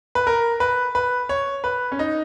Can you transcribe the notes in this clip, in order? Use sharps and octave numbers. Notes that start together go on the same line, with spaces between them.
B4
A#4
B4
B4
C#5
B4
C#4
D#4